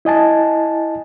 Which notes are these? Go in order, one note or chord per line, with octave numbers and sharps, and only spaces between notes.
E4 D#5 G#5 A5